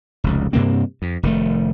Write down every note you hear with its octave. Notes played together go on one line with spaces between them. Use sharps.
F1 C#2
G2 C3 A#3 C4
F2
F1 D#3 A3